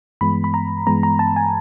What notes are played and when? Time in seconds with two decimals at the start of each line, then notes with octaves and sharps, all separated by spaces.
0.21 G2 E3 G#3 B3 B5
0.44 B5
0.54 A#5
0.87 G2 E3 G#3 B3 A#5
1.03 A#5
1.19 A5
1.36 G#5